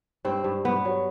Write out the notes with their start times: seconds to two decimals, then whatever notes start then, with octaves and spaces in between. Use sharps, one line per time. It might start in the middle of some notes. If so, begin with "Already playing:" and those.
0.25 G2 C4
0.44 G2
0.65 G2 B3
0.85 F#3